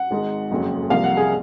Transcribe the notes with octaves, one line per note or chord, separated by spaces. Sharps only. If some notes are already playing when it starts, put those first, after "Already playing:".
Already playing: F#5
G#1 G#2 D#3 G#3
F#1 F2 C#3 F#3
C2 C3 F3 A#3 F5
F#5
G#4